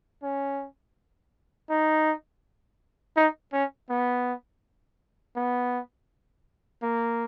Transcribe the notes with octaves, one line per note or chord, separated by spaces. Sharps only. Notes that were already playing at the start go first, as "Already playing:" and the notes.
C#4
D#4
D#4
C#4
B3
B3
A#3